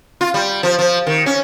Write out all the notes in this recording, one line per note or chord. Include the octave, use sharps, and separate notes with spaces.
F4
G3
F3
F3
D#3
C#4